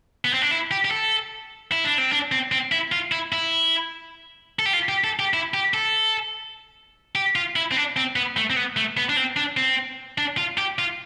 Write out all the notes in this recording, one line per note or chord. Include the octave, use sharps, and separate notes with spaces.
B3
C4
D4
E4
G4
G4
A4
E4
D4
C4
D4
C4
C4
E4
F4
E4
E4
A4
G4
F4
G4
A4
G4
E4
G4
A4
G4
F4
E4
C4
D4
C4
B3
A3
C4
B3
A3
B3
D4
C4
D4
C4
D4
F4
G4
F4